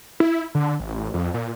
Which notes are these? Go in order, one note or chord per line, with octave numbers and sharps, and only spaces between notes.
E4
D3
A1
F2
A#2